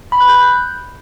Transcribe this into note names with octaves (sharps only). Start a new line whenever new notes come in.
B5
F#6
G6